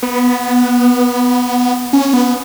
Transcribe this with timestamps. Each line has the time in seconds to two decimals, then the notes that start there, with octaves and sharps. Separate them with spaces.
0.03 B3
1.93 C#4
2.13 B3